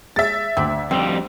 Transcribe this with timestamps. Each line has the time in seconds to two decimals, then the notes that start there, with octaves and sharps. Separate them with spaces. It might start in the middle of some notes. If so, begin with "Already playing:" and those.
0.16 G#3 E5 A6
0.57 D2 C4 D4
0.91 F2 G3 C4